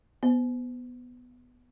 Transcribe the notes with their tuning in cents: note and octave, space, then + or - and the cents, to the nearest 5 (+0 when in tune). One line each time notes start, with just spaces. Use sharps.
B3 +0 C5 -25